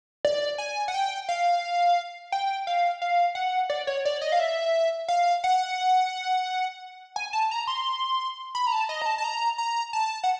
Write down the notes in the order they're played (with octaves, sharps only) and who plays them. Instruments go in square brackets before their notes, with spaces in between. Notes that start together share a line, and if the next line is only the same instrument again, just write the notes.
[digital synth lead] D5
G#5
F#5
G5
F5
G5
F5
F5
F#5
D5
C#5
D5
D#5
F5
E5
F5
F#5
G#5
A5
A#5
C6
B5
A#5
A5
D#5
A#5
A5
A5
A#5
A#5
A5
F#5